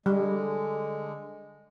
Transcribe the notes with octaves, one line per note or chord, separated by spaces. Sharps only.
D3 G3 G#3